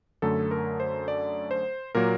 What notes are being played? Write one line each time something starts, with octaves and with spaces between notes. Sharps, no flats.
F#2 D3 A3 A4
A#4
C5
D5
C5
A#2 F#3 A#3 A#4